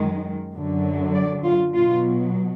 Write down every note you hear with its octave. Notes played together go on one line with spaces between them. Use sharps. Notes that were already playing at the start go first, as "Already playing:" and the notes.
Already playing: F#2 D#3 G#3
F#2 D3 F#3
D5
F4
B2 F#3 F4